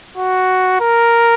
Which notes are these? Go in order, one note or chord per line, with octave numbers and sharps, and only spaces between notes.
F#4
A#4